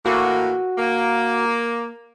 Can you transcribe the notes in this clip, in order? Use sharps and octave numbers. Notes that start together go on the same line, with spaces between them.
A2 E3 A#3 F#4
A#3